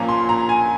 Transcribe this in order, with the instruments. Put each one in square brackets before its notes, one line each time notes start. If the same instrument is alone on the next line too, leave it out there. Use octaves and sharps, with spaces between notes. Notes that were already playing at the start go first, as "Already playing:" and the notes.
Already playing: [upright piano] A#2 F3 A#3 C#4 [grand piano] A#5
[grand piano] C6
A#5
G#5